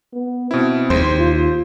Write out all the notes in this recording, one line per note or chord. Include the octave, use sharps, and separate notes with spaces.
B3
B2 C4 E4
D#2 C5
F4